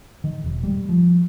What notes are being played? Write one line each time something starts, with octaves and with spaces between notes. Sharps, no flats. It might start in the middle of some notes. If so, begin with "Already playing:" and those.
D#3
E1
G3
F3